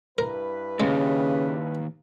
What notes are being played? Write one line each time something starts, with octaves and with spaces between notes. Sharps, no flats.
G2 E4 A#4 B4
D#2 C#3 G#3